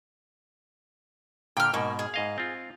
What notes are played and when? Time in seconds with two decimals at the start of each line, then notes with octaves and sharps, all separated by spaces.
1.57 A#2 D3 G5 F6
1.74 G#2 B2 A#3 C#6
1.99 G#4
2.14 G#2 D#5 F5
2.38 C4 F4